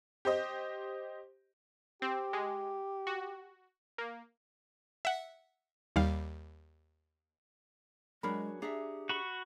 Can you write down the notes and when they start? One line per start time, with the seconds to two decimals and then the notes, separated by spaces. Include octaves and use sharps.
0.25 G4 C5 D#5
2.02 C4 G4
2.33 G#3
3.07 F#4
3.98 A#3
5.05 E5 F#5
5.96 D#2 G3 F5
8.23 F#3 G#3 D4 F#4 G#4 A#4 B5
8.62 D4 G4 G#4 E5 F#5 A#5
9.09 F#4 B5 C#6